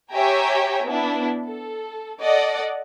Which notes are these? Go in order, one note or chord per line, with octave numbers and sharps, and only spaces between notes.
G4 C#5 E5 G5 G#5 A#5
B3 D4 E4
A4
A4 D5 D#5 F#5